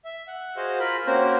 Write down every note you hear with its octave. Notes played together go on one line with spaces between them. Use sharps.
E5
F#5
F#4 G#4 C5 D#5 F5
F4 A#4 B5
A#3 C4 C#4 F#4 A#4 C5